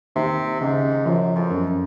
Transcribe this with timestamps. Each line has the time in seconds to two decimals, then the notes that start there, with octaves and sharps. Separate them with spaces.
0.15 D#2 C3
0.61 G#2 C#3
1.05 F#2 F3
1.35 F2
1.50 F#2